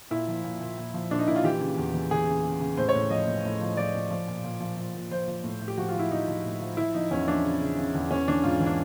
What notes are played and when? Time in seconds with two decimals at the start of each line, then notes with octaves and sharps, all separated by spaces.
0.11 A#2 E4
0.28 F3
0.44 A#2
0.61 A#2
0.78 A#2
0.94 F3
1.11 A#2 D4
1.19 D#4
1.28 A#2 E4
1.36 F4
1.44 E3 G4
1.61 C#3
1.78 E2
1.94 E3
2.11 E3 G#4
2.28 C#3
2.44 C#3
2.60 C#3
2.77 A2 C5
2.89 C#5
2.95 A2
3.10 F3 D#5
3.28 A2
3.45 A2
3.61 F3
3.77 F3 D5
3.95 F3
4.10 F3
4.28 A#2
4.44 A#2
4.60 F3
4.77 F3
4.94 A#2
5.11 F3 C5
5.28 F3
5.44 A2
5.61 A2
5.68 G4
5.77 F3 F#4
5.89 F4
5.94 F3
5.99 E4
6.11 F3 D#4
6.27 F3
6.45 A2
6.61 F3
6.77 F3 E4
6.94 F3 D#4
7.11 E2 C#4
7.28 F3 D4
7.45 C#3
7.61 C#3
7.78 C#3
7.95 E2
8.11 E3 C#4
8.28 E3 D4
8.44 G#2 F4
8.60 E3
8.66 D4